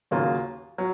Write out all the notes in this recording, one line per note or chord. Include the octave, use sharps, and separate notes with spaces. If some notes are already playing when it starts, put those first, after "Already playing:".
D#2 C#3 F#3 A#3 F4
F#3